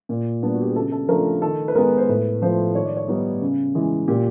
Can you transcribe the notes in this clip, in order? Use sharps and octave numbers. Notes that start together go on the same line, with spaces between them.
A#2
G3 B3 D4
F#4
G4
G#4
C#3 A4
A4
F3 A3 D4 A#4
D#3 A4
B4
G#3 B3 A#4
C5
A2 B4
F3 A3 C5
D#3 C#5
D5
C#5
G3 B3 D#4
C#3
E3 G#3
A#2 G4